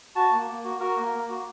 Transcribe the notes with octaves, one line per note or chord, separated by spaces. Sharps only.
F#4 A5
A#3
A#3
F#4
F#4 A#4
A#3
A#3
F#4